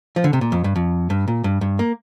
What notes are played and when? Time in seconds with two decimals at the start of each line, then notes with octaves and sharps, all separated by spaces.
0.16 F3
0.24 D3
0.33 C3
0.41 A#2
0.52 F2
0.64 G2
0.76 F2
1.10 G2
1.28 A#2
1.44 G2
1.61 G2
1.79 A#3